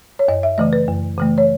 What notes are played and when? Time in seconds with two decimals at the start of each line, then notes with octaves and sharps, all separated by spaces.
0.19 C#5
0.28 F#2 D#5
0.43 E5
0.58 C#3 E3 A3 D#5
0.73 B4
0.88 F#2
1.18 C#3 E3 A3
1.38 C#5